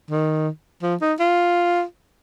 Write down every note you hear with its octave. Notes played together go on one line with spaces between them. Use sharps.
D#3
F3
D#4
F4